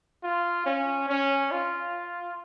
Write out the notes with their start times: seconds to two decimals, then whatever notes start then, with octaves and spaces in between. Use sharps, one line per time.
0.23 F4
0.66 C#4
1.09 C#4
1.51 F4